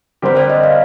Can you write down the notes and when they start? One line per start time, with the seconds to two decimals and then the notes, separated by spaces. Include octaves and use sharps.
0.22 D3 G3 C4 G4 A#4 C5
0.37 D5
0.50 D#5
0.63 F5